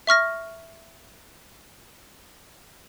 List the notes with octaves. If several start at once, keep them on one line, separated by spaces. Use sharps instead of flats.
E5 C#6 F6 A#6